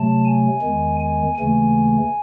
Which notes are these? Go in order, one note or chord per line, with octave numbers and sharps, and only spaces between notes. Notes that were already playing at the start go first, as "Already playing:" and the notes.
Already playing: C3 F#3 A3 A5
G#5
E2 D#3 G#3
G#5
D#2 C#3 E3 A3 G#5